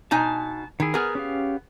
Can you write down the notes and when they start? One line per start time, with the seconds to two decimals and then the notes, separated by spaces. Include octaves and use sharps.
0.11 B2 D#4 G#5 A5
0.80 D#3 E4 G#4
0.94 B3 G#4 A#4 G#5 F6
1.15 C#4 G4 F5